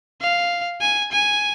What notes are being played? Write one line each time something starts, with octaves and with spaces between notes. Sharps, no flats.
F5
G#5
G#5